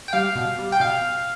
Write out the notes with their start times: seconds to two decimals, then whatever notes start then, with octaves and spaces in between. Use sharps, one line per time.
0.08 G5
0.13 G3 F5
0.35 B2
0.59 G3
0.72 G5
0.80 B2 F5